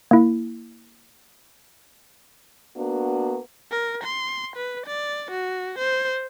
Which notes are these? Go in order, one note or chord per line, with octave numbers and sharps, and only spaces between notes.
A#3 E4
A#3 B3 D4 F#4
A#4
C6
B4
D5
F#4
C5